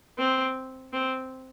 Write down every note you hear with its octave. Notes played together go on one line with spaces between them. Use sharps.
C4
C4